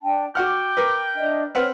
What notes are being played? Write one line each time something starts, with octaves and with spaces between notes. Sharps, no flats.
D4 G5 A5
F#4 F#5 G5 D6 F6
A#4 B4
D4 D#5 E5
C4 B4 C#5 F#5 F6